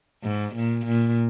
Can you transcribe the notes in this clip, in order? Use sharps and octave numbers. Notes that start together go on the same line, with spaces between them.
G#2
A#2
A#2